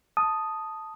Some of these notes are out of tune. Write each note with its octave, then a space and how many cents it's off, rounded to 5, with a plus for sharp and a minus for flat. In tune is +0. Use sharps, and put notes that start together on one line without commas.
A5 +0 D#6 +0